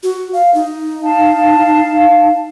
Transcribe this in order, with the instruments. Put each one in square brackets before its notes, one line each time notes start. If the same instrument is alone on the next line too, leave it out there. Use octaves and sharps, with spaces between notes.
[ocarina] F#4
F5
D#4
[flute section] F5 A5